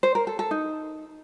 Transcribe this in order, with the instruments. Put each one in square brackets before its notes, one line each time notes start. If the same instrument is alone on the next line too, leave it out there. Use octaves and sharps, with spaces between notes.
[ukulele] C5
A#4
A4
A4
D#4